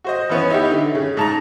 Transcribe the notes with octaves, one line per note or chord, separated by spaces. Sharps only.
F#4 C5 D#5
E3 B3 C#4
D#4 E4 G4
D3
C#3
G#2 A5 A#5